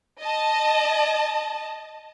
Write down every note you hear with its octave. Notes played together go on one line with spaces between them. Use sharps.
D#5 A5